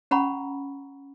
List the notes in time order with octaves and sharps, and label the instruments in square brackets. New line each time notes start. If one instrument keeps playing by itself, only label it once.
[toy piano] C#4 F#5 A#5 B5 C#6